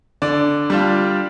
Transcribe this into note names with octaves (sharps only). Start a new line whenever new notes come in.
D3 D5
G3 D4 F4